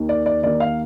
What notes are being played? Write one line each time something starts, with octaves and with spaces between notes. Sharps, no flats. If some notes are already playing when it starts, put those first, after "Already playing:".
Already playing: D#2 D#3 A#3
D5
D5
D#2 D#3 A#3 D5
F5